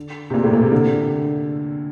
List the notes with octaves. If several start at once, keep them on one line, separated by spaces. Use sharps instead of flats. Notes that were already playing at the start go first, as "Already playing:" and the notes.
Already playing: D3
C3
A#2
A2
A#2
C3
D3